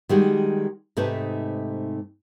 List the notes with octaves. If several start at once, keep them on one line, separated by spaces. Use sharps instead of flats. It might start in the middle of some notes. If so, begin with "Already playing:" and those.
D#3 G3 G#3 F#4
G#2 C3 A3 D#4 B4 A5